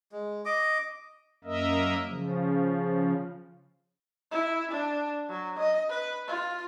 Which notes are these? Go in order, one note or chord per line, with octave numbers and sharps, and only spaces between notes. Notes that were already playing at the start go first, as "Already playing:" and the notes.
G#3
D#5 D6
F#2 A#3 A#4 D#5 E5
C#3 F3
E4
D4
F#3
D#5
B4
F4